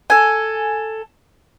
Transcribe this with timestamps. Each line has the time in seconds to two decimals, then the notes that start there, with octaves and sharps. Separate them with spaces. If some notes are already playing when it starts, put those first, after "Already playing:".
0.10 A4 G#5